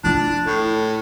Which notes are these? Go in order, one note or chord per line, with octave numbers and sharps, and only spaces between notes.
D4 E4 F4
A2